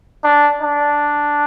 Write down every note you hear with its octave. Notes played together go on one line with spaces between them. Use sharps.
D4
D4